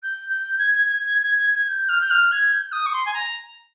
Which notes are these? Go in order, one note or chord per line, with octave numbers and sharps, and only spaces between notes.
G6
G6
G#6
G#6
G#6
G#6
G#6
G#6
G#6
G6
F6
G6
F6
G#6
G6
D#6
C#6
C6
G#5
A#5